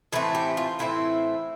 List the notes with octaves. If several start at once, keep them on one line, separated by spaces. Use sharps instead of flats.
A2 E3 A3 C4 B4
G4
F4
A2 E3 A3 C4 E4